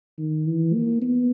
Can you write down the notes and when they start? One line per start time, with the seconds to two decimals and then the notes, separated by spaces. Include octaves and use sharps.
0.19 D#3
0.47 E3
0.75 A#3
1.02 B3